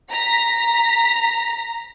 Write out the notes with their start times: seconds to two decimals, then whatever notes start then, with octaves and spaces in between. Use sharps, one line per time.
0.11 A#5 B6